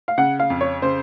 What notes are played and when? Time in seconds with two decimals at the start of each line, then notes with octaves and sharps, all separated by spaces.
0.08 F5
0.18 C#3 F#5
0.40 F5
0.50 F2
0.61 C#5
0.82 C#3 C5